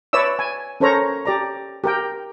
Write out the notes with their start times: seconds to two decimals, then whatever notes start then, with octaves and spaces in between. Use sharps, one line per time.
0.13 B4 C#5 D5 E5 E6
0.39 G#5
0.80 C#4 A4 A#4 C5 C#5 A#5
1.25 G4 D5 A#5
1.84 G4 A#4 G5